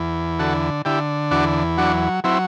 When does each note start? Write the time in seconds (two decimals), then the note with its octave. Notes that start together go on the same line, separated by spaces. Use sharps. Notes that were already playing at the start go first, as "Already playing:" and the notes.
Already playing: E2
0.39 D3 F#4 A4
0.85 D3 E4 G4
1.31 E2 D4 F#4
1.77 F#3 D4 F#4
2.24 F#3 C4 E4